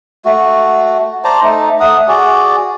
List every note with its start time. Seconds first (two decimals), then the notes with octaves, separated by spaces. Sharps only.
0.25 A3 F#4
1.24 C5 D5 A5 A#5
1.42 A3 D#4
1.80 A3 F#5 D#6
2.08 F#4 G#4 D5